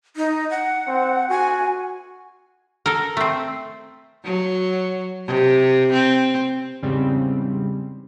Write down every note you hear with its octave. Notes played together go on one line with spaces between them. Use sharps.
D#4
F#5
C4
F#4 G#5
A4 A#4
A3 C4
F#3
C3
C4
E2 G#2 C#3 G3 C4